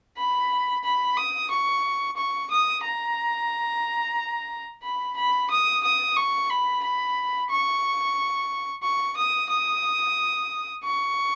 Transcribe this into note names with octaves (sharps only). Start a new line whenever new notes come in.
B5
B5
D#6
C#6
C#6
D#6
A#5
B5
B5
D#6
D#6
C#6
B5
B5
C#6
C#6
D#6
D#6
C#6